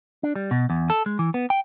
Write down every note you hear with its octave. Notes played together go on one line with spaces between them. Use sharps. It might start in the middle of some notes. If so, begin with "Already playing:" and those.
D4
G3
B2
E2
A4
G#3
E3
B3
G5